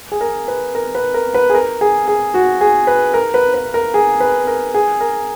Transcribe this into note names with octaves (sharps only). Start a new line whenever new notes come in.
G#4
A#4
B4
A#4
B4
A#4
B4
G#4
A#4
G#4
G#4
F#4
G#4
B4
A#4
B4
B4
A#4
G#4
B4
A#4
G#4
A#4